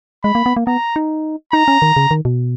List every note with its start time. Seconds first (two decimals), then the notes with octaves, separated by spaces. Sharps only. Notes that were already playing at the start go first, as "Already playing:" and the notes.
0.24 G#3 B5
0.35 A#3
0.46 B3
0.57 A#3
0.67 B3 A#5
0.96 D#4
1.53 D#4 A#5
1.68 C#4
1.82 D#3
1.96 C#3
2.11 D#3
2.25 B2